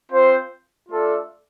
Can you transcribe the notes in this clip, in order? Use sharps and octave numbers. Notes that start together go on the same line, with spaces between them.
C4 F4 C5
A3 D4 F4 A4